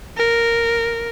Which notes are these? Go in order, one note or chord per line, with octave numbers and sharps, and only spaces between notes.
A#4